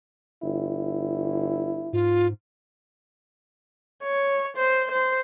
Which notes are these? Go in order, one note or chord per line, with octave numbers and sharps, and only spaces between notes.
G1 E4
G#2 F4
C#5
C5
C5